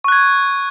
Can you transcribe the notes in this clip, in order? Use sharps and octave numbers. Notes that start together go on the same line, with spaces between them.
C#6 F#6 G#6